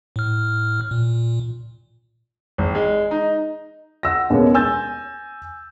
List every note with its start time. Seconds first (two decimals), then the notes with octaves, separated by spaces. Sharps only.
0.16 A2 F6
0.91 A#2
2.58 G#1
2.75 G#3
3.11 D#4
4.03 F#5 E6 A#6
4.30 D#2 B2 G#3 C#4
4.54 G#5 E6 G6 A6